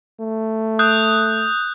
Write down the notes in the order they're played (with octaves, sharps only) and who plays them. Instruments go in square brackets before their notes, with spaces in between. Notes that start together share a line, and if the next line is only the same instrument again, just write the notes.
[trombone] A3
[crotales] D#6 F#6 G6